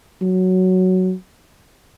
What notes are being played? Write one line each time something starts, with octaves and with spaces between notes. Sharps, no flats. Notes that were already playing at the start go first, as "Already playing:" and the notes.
F#3